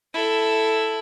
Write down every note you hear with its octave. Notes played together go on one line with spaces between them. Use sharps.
E4 A4